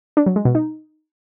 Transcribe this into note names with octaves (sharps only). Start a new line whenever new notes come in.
D4
F#3
G#3
B2
D#4